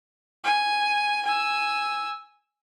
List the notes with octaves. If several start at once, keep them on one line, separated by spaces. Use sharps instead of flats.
G#5
G#5 E6